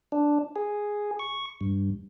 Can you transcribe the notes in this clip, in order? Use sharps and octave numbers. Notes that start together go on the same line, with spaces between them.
D4
G#4
C#6
G2